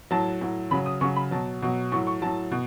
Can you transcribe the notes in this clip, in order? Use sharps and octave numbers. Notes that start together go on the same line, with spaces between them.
A2 F#3 A5
A2 F#3
C#3 F#3 B5
D#6
C#3 F#3 C#6
B5
B2 F#3 A5
B2 F#3
A2 F#3 C#6
C#6
A2 F#3 A5
B2